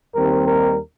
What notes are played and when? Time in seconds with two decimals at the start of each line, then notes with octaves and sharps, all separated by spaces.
0.15 D#2 D#3 G3 C4 A#4
0.46 A#4